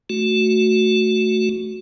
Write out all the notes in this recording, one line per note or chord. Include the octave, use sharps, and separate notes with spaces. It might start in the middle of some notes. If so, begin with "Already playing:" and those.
A3 F#4